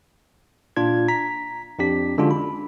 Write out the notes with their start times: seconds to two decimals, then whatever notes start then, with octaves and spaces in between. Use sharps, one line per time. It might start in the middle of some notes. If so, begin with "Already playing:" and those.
0.76 A#2 D4 F4 G#6
1.08 A#5 B6
1.79 F2 D4 G4 B6
2.18 D3 G#3 C#4 D4 F4 F#4
2.31 B5